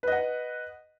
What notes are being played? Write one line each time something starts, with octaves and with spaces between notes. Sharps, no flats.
B4 D#5 F#5